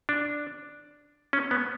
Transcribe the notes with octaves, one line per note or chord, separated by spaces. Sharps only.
D4
C#4
B3